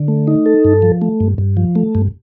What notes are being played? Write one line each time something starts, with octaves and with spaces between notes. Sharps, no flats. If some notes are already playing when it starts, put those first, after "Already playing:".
Already playing: D3
A3
D#4
A4
G2
F3
A3
G2
G2
F3
A3
G2